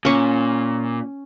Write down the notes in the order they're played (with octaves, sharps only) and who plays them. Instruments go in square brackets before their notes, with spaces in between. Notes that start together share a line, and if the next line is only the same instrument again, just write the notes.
[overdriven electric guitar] A#2 [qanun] C#4 C#6